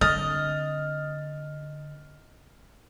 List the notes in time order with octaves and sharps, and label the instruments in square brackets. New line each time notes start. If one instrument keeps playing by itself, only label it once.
[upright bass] D3 C4 [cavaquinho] D#5 [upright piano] F6 A6